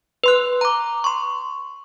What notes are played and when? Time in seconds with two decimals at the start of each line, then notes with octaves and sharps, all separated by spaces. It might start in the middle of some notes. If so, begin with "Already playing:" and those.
0.24 B4 C6 F#6
0.61 A#5 D6
1.04 C6 C#6